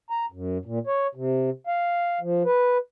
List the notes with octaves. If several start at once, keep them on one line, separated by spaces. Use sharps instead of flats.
A#5
F#2
A#2
C#5
C3
F5
F3
B4